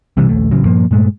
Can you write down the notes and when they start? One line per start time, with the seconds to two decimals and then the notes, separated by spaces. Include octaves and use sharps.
0.17 B1 C3 E3 G3
0.29 A#1 D#2 A3
0.51 A1 C#3 F#3
0.65 G2 A#2 F3 A#3
0.91 G2 A#2 G#3 A3